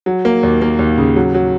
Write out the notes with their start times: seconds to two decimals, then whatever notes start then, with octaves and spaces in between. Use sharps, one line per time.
0.06 F#3
0.25 A#3
0.43 D#2
0.62 A#3
0.79 D#2
0.98 C#3
1.16 F#3
1.34 F#3